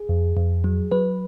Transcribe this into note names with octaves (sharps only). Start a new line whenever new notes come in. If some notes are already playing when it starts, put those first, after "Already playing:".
Already playing: G#4
F2
F2
F#3
F#3 B4